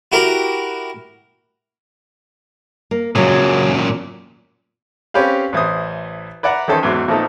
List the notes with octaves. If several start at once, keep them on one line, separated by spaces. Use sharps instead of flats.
E4 F#4 G4 A#4 A#5 B5
A#3
F#2 A#2 C#3 F#3
C4 C#4 G4 B4 F5
A1 E3 C5 D#6
B4 D5 E5 F#5 A#5
D#3 E3 C#4 A4 C5
E2 G#2 E3 F#3 D6
A#2 F3 A3 D#4 A4